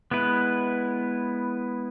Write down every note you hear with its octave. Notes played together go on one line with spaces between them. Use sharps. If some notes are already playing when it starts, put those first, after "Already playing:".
G#3 B3 E4 B4